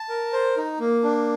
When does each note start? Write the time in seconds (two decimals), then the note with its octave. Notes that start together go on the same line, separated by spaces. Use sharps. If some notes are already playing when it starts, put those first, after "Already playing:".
Already playing: A5
0.09 A#4
0.33 C5
0.57 D#4
0.80 A#3
1.04 D4